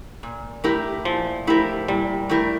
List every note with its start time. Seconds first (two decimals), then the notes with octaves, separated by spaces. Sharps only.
0.23 A#2
0.64 A3 E4 G4 A#4
1.05 A#2 F3
1.47 A3 E4 G4 A#4
1.88 A#2 G3
2.29 A3 E4 G4 A#4